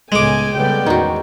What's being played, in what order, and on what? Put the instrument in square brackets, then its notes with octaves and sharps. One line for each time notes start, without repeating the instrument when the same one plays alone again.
[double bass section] C#2 A2 [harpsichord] G#3 D6 [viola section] B3 A4 G#5
[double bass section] C#3 G3 B3 [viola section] A4 D5 G5
[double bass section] E2 A2 [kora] D#3 F#4 [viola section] C#4